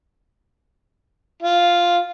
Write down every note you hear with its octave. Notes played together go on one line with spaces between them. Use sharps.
F4